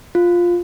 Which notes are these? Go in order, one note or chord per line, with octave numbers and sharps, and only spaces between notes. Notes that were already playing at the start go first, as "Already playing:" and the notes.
F4